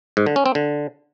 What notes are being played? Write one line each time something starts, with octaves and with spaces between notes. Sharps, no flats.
G#2
D3
C#4
C4
D3